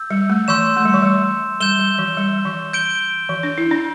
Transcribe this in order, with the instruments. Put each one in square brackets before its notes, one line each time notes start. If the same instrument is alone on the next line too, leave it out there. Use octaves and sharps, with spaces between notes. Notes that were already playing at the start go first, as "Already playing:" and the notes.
Already playing: [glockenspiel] E6 G6
[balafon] G3
A3
[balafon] E3 [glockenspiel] C6 E6 G6 E7
[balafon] A3
G3
E3
G3
[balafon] G3 [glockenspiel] G6 E7 G7
[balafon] G3
E3
G3
E3
[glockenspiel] G6 D7 G7
[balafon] E3
D4
E4
D4